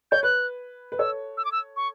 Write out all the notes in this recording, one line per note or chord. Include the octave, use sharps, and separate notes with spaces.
C#5 G6
B4 F#6
B4
A4 C#5 E6
E6
D6
E6
C#6